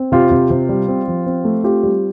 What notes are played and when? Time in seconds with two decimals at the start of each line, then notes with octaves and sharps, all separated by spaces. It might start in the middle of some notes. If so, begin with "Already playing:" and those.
Already playing: C4
0.12 C3 F4 G4
0.31 C3
0.50 C3
0.69 G3
0.88 C4
1.08 F3
1.26 C4
1.45 A3
1.64 C4 F4 G4
1.83 G3